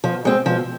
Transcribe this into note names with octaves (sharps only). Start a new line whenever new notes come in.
B2 F3
G#3 C4
B2 F3